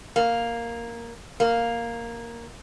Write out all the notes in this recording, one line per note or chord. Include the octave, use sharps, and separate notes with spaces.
A#3
A#3